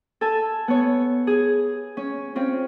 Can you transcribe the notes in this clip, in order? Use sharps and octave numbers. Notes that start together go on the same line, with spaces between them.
A4 G#5 A5
B3 C#5
G#4
C#4
C4 C#4 F4